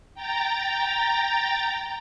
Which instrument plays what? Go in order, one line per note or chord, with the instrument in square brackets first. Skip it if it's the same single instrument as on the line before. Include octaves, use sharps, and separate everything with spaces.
[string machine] G5 A#5 A6